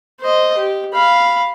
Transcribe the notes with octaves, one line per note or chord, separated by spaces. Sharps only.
C5 D#5
G4
F5 B5